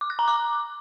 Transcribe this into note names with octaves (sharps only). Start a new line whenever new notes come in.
D6
F#6
A#5
D6